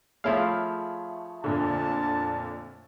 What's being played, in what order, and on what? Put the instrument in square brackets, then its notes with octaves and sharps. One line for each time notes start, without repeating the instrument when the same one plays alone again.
[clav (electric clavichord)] F3 E4 F5 [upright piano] A3 G#4 C#5
[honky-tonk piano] F2 A#2 D3 [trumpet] A5